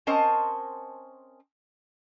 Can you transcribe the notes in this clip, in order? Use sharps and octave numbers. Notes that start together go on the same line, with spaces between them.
C4 C#4 A#4 C5 D#5 A5